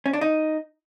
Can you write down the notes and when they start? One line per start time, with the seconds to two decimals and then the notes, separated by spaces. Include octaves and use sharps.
0.06 C#4
0.13 D4
0.21 D#4